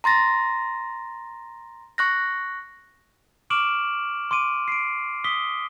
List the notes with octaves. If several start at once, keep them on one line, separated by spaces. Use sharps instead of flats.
A#5 C6 A6 A#6
C#6 F#6 A#6
C#6 D6 F6 D7 E7 F#7
C6 D6 D7 D#7
C7 D7
D#6 B6 G7